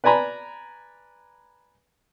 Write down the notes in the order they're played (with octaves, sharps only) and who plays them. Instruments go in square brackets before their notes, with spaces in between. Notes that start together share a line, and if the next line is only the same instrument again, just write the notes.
[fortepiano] B4 D5 G#5 A#5 B5